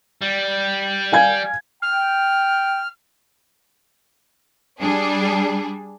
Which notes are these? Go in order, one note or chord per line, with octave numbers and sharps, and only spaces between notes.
G3
F5 G#5 G#6
G5 F6
G3 D4 G#4